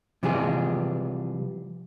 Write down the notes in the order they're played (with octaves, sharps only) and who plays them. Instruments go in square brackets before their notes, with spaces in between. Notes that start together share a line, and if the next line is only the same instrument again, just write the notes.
[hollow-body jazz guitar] C3 E3 F3 G3 G#4